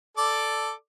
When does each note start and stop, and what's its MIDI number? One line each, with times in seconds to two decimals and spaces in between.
0.18 0.71 69
0.18 0.71 74
0.18 0.71 86